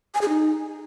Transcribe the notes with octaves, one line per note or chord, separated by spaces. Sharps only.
G#5
G#4
D#4